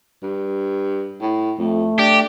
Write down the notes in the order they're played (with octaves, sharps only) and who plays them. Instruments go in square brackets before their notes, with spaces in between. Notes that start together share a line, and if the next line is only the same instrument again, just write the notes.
[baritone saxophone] G2
A2
[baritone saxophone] F2 [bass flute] A3
[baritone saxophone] D4 [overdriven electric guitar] G4